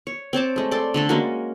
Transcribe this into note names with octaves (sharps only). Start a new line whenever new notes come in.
C#5
C4 C#5 A5 D6
G#3 A3
A4 D5 G5 C6
D3 A3 A4
G#3 A#3 C#4 F#4